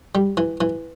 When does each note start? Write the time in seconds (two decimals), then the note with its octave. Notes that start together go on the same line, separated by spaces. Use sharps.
0.15 G3
0.37 E3
0.61 E3